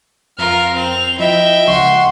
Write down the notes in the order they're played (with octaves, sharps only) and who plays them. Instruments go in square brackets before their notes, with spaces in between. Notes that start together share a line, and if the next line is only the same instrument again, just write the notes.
[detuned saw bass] F2 [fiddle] F4 A#4 [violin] F6
[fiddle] C4 [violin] F7
[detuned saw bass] F3 [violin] E4 [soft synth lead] D#5 [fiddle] E5 G5
[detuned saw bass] C#2 [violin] F#5 C6 [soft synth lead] C#6